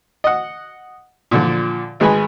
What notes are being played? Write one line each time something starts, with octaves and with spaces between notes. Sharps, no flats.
D#5 F#5
A#2 D3 F3
G#1 G#3 B4 G#5 B5